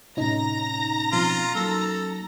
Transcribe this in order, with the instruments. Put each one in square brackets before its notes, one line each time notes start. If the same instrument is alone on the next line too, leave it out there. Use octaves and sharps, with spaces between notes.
[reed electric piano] A2 C3 [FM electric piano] C#4 D#4 [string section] A#5 A#6
[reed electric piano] B2 F3 C4 [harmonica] F4
[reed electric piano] F#3 A#3 [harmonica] A4